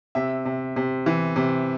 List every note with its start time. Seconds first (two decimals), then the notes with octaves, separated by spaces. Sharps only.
0.15 C3 E5
0.46 C3
0.76 C3
1.06 E3
1.36 C3